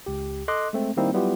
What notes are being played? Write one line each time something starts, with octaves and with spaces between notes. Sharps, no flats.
C#2 G4
A4 D#5 C6 D6 F#6
G#3 A3 C4
D#3 G3 A#3 C4 D#4 E4
F#3 G3 B3 E4 F4 G4